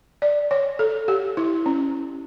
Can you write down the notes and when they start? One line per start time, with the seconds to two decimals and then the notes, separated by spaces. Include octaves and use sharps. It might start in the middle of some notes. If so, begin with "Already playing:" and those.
0.22 D5
0.51 C#5
0.79 A4
1.08 G4
1.37 E4
1.66 C#4